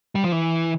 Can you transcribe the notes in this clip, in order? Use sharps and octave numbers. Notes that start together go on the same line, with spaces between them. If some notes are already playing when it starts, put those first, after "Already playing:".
G3
F3
E3